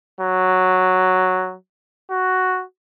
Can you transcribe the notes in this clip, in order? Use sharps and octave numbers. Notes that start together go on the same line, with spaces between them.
F#3
F#4